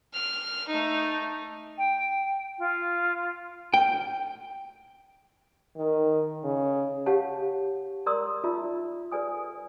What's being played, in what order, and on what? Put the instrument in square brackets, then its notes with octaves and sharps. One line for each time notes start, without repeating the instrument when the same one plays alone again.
[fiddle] F6
A3 D#4
[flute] G5
F4
[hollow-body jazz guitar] G5
[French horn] D#3
C#3
[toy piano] G4 C#5 F5 F#5 A5
A#4 D5 A#5 C6 D#6 E6
D#4 F4 D5 E5 A#5
A4 B4 D5 G#5 D#6